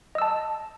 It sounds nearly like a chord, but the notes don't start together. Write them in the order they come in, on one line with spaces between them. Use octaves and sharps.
D#5 E6 A5